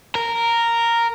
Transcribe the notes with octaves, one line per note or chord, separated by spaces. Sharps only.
A#4